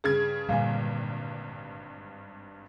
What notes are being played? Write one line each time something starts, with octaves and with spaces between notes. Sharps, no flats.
G2 C#3 G#4 G#6
G#1 G2 A#2 D3 G3 F5 G#5